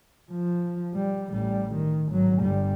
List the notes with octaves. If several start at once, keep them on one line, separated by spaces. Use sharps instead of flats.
F3
G3
A1 G3
D#3
G#1 F#3
G1 G3